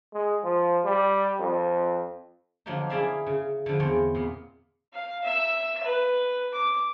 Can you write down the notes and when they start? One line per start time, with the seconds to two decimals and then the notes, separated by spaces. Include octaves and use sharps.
0.14 G#3
0.44 F3
0.85 G3
1.40 F2
2.66 D3 F3 F#3 A#3 D4 D#4
2.89 C#4 E4 G#4 D5 E5 F5
3.26 C#3
3.66 D3 F3
3.80 E2 C4 C#5 D5
4.15 A#2 B3
4.93 F5
5.24 E5 E6
5.83 B4
6.52 D6